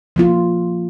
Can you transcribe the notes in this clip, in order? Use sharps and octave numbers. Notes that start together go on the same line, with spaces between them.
F3 A#3 F4